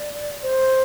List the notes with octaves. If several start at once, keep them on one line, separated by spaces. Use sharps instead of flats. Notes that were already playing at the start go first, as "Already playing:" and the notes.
Already playing: D5
C5